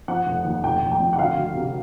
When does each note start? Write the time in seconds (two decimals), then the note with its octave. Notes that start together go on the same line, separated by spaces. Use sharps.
0.08 F3 F#5
0.27 F1
0.45 D#2
0.64 F1 G5
0.82 F1
0.92 G5
1.00 F2
1.13 F#5
1.19 D2 F5
1.37 D2
1.55 C3